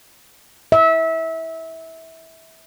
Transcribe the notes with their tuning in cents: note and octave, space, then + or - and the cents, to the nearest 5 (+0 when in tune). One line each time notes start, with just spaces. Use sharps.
E5 -25